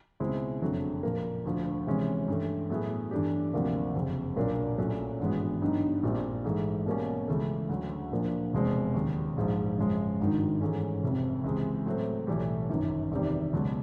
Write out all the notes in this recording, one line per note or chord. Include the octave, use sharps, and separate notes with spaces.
C#2 B2 G#3 C4 E4
F#1 F2 D3 F#3 A3
A#2 F3 A#3
D2 D3 F3
C3 E3 G#3 C#4
G2 E3 A3
A2 F#3 B3 E4 G#4
G2 E3 A3 D4 G4
D2 C3 F3 A#3 D4
F#1 F2 C3
B1 A#2 F#3 A#3 D4
A#1 A#2 F#3 A3 C#4
G#1 G2 E3 G#3 B3
G2 D3 F#3 B3 D#4
A#1 A#2 G3 C4
G#2 E3 A3
B2 G3 A#3 C#4
C#2 C#3 E3 A3
D2 D3 F#3
A#2 F3 A#3 D4
F1 E2 B2 G#3 C4
D#2 C#3 F#3
A#1 G#2 F3
F#2 C#3 F3 G#3
G#1 G2 D#3
G#2 E3 A3 C#4
F1 F2 C3
C#2 C3 E3 G#3
A2 F#3 A3 C4
B1 A2 E3 G3
G1 F#2 D#3
E2 C3 D#3 G3
C#2 B2 F#3